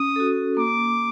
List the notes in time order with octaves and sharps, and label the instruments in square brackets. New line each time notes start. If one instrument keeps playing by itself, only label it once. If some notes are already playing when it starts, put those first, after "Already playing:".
Already playing: [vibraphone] C#4 [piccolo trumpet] D#6
[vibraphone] F#4 A4
[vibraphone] A#3 [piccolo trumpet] D6